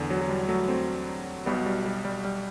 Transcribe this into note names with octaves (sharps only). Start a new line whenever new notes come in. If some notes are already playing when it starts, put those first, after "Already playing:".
Already playing: E2 D3
F#3
F#3
G3
F#3 A3
A3 C4
B1 B2 G3 B3
G3
G3
G3
G3